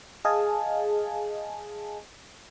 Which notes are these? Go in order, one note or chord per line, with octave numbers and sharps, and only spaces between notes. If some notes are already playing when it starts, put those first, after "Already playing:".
G#4 D#5 F5 G#5 A5